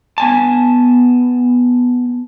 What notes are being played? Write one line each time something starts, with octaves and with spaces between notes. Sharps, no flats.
B3 G#5 A5